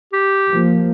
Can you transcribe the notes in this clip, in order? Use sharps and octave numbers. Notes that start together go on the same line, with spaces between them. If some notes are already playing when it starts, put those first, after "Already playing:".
G4
F3 A#3